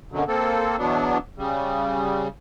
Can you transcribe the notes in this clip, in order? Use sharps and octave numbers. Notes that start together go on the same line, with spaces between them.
F#2 B2 D3 F#3
A#3 C4 A4
E2 B2 F#3 B3 D4
C#3 G3